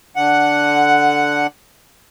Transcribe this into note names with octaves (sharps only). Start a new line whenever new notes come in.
D3 F#5